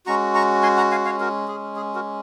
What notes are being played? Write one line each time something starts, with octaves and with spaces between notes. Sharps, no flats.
G#3 C#4 F#4 A#5 C#6
A#5 C#6
G#5 C6
F#5 A#5
F5 G#5
C#5 F5
F#4 A#4
G#4
G#4
F#4 A#4